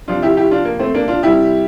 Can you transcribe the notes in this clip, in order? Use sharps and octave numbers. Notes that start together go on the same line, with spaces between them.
C3 F3 D4 F4
E4 G4
E4 G4
D4 F4
A#3
A3 C4
A#3 D4
D4 F4
C3 G3 E4 G4